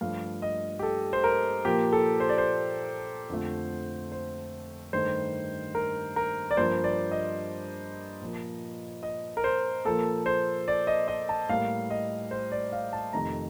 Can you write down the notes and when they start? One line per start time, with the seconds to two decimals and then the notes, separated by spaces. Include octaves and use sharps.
0.01 G2 F3 A3 F5
0.42 D#5
0.79 G4
0.83 A4
1.13 C5
1.24 A#4
1.65 A#2 F3 A#3 G4
1.93 A4
2.20 C5
2.29 D5
2.38 C5
3.30 F2 D3 F3 A3
4.12 C5
4.93 G2 D#3 A3 C5
5.75 A#4
6.16 A#4
6.51 D5
6.57 G2 F3 A#3 C5
6.84 D5
7.12 D#5
8.22 A#2 F3 A#3
9.03 D#5
9.37 A#4
9.44 C5
9.85 A#2 F3 A#3 A4
10.26 C5
10.68 D5
10.87 D#5
11.08 D#5
11.29 A5
11.49 A2 G3 A#3 F5
11.90 D#5
12.31 C5
12.52 D5
12.72 F5
12.93 A5
13.13 F2 C3 D#3 A3 A#5